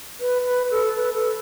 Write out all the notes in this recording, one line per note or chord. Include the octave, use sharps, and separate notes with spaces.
B4
B4
A4
B4
A4